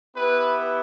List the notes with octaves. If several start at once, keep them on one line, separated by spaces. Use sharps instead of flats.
B3 E4 G4 B4